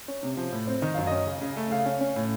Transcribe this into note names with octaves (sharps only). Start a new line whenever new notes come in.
C#4
C3
F3
A2
C4
D#3 D#5
F#2 F5
C#4 D#5
C#3
C#3
A3
C#3 F5
C#4
C#4
A2